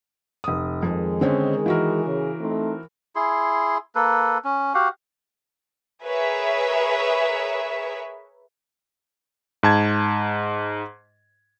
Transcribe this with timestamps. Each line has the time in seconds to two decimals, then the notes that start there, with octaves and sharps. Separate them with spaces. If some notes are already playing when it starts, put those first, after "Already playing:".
0.44 F1 D#6
0.83 F2 D#3 G#3
1.21 D3 C4 C#4
1.66 E3 F#4 A#4
2.05 C#3
2.40 A3 C4 D#4
3.16 E4 G#4 C6
3.95 A#3 A4 B4
4.45 C#4
4.74 F#4 G4 F5 F#5
6.05 G#4 A#4 B4 C#5 E5
9.63 G#2 A5 G#6